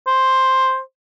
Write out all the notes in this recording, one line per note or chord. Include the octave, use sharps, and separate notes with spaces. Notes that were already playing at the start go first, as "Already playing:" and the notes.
C5